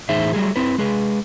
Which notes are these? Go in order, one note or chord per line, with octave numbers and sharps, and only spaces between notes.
A2 E3 D#4 G#4 C5 E5
F#3 G3 A3 G#4
C4 E4 B4
G#3 G#4 B4